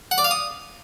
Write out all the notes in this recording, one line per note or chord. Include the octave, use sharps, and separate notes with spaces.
F#5
D5
F5
D#6